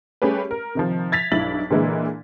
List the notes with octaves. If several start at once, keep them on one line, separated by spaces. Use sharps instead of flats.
G3 A3 C#4 G4 G#4 B4
A#4
C3 D#3 F3
G#6 A6 B6 F7
B1 G2 E4 A6 F#7
A#2 D3 E3 G#3 A#3 E4